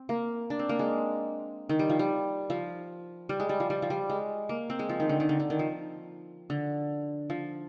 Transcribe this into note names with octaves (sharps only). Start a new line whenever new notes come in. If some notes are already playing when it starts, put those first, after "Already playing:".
Already playing: C4
A#3
D4
C4
A#3
G#3
D#3
G3
F3
G3
F3
G3
G#3
G3
F3
G3
F3
G3
G#3
A#3
C4
G#3
F3
D#3
D3
D#3
D3
D3
D#3
F3
D3
F3